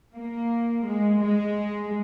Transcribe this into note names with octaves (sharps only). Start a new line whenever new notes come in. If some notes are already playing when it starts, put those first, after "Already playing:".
A#3
G#3
G#3